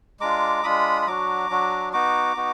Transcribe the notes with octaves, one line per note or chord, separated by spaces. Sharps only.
G#3 D4 F4 A#5 D6
G#3 D4 F4 B5 D#6
B5
F#3 D4 F#4 A#5 D6
F#3 D4 F#4
B3 D#4 F#4 A#5 D6
B3 D#4 F#4